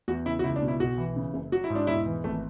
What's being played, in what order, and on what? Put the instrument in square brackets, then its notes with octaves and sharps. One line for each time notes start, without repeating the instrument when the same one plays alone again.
[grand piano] E2 F#4
C#3 E4
F#4
C#2 E4
D4
B2
E4
B1 F#4
E3
C#3
F#1
F#3 F#4
E4
G#2
D4
E1 E4
E3
G#1 A3